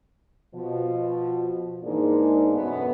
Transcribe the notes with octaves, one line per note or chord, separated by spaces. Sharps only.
B2 F3
G#2 E3 G#3 A#3 D4 D#4
F#2 B2 A3 B3